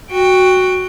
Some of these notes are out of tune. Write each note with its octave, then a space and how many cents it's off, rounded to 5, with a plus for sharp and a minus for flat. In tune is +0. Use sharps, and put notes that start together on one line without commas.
F#4 +0 G5 +15